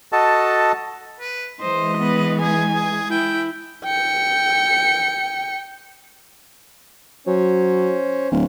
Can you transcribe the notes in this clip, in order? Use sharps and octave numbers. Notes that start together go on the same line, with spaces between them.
F#4 A4 D#5 A5
B4
E3 G#3 C5 D#5
B3 B4
G#4 G#5
G#4
E4 G5
G5 C#7
F#3 C#4 C5 C#5
D1